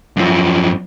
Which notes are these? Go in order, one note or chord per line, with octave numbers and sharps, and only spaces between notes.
F#2 F3